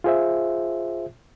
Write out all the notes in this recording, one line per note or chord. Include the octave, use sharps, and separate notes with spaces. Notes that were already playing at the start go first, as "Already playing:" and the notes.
F4 G#4 C5 E5